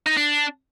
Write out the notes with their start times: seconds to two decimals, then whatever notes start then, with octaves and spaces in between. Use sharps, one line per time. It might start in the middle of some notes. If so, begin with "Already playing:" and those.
0.06 D#4
0.17 D4